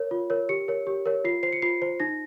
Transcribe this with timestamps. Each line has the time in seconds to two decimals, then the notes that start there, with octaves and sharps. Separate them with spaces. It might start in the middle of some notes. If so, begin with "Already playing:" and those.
Already playing: A#4 C#5
0.11 F4
0.30 A#4 C#5
0.49 G4 C#7
0.68 A#4 C#5
0.87 G4
1.06 A#4 C#5
1.25 F4 C7
1.43 C5 C7
1.53 C#7
1.62 F4 C7
1.82 C5
2.00 D#4 A#6